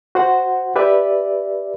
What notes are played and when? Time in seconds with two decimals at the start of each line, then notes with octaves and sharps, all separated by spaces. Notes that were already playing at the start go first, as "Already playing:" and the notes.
0.15 F#4 C5 F#5
0.76 G4 B4 D5 E5